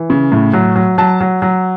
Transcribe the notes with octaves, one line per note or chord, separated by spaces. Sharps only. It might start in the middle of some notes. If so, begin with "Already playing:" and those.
Already playing: E3
C#3
A2
F#3
F#3
F#3 A5
F#3
F#3